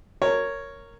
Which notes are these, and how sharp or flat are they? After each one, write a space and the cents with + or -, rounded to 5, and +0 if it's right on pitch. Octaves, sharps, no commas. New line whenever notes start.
A#4 -10 C#5 +0